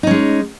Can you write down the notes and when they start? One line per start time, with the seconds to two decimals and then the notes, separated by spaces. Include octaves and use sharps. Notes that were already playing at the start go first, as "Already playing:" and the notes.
0.03 D#4
0.07 C#4
0.11 G#3